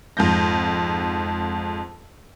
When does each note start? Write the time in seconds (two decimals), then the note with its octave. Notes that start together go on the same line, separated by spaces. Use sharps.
0.17 F2 G#2 G6 A#6